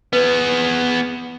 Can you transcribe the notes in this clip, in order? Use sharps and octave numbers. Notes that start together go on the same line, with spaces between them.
B3 G#4 B4